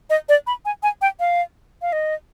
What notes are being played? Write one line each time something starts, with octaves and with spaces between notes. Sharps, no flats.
D#5
D5
B5
G#5
G#5
G5
F5
F5
D#5